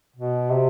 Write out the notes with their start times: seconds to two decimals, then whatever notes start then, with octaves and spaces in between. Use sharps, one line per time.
0.16 B2
0.52 C3